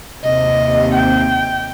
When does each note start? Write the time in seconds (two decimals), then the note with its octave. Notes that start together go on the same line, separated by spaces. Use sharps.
0.24 D#2 C3 D#5
0.95 G5